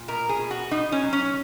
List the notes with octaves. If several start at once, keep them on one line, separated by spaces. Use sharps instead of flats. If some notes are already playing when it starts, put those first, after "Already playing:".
Already playing: A#2
B2 A#4
G#4
B2
F#4
B2 D#4
C#4
F#3
C#4